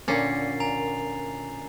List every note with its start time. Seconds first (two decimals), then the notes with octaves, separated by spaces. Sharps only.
0.08 A#2 D3 C#4 A6 C7
0.60 G#5 A#5 F7